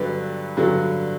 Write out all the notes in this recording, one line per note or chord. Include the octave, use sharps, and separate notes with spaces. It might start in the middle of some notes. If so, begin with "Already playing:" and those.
Already playing: G2 D3 F#3 B3 B4 D5
G2 D3 F#3 B3